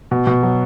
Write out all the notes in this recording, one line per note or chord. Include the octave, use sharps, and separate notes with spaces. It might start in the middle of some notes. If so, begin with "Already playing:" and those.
B2
B2
F#3